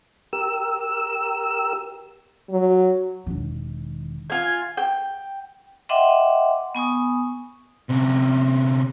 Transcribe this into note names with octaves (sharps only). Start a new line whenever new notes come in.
G4 A#4 E6
F#3
E1 D#3
F4 G#5
G5
D#5 E5 F#5 G5 C6 D6
B3 G#5 C#6 D#6
C3 C#4